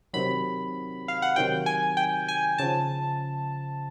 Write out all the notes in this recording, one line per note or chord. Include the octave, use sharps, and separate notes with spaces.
C3 D#3 F#3 B5
F5
F#5
C3 D#3 F#3 G5
G#5
G5
G#5
C#3 F3 A5